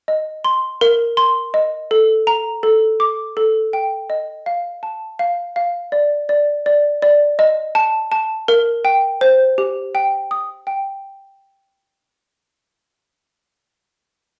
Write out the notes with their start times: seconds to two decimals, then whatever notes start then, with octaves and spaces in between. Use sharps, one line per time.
0.08 D#5
0.45 C6
0.81 A#4
1.17 C6
1.54 D#5
1.91 A4
2.27 A#5
2.63 A4
3.00 D6
3.37 A4
3.73 G5
4.10 D#5
4.46 F5
4.83 A5
5.19 F5
5.56 F5
5.92 D5
6.29 D5
6.66 D5
7.02 D5
7.39 D#5
7.75 A5
8.12 A5
8.48 A#4
8.85 G5
9.21 C5
9.58 G4
9.95 G5
10.31 D#6
10.67 G5